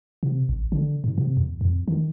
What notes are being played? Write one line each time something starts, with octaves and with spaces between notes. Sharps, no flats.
C3
A1
D3
G#2
C3
E2
F2
D#3